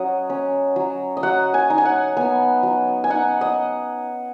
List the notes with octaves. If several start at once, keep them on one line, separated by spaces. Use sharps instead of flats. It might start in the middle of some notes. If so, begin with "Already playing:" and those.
Already playing: F#3 C#4 D#5 F#5
C#4
F#3
D#5
F#3 F#5
G#5
D#4
G#5
F#5
B3 G#5
F#3
G#5
D#4 F#5
D#5